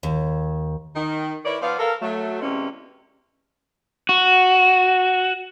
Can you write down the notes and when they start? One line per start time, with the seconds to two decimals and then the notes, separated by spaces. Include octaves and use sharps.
0.03 D#2
0.95 D#3
1.45 E4 A#4 B4 C#5 D5
1.61 F3 B3 C5 D5 F5
1.78 A4 A#4 F5
2.01 F#3 A3
2.41 C3 E3 G#3 A#3 C#4 D5
4.09 F#4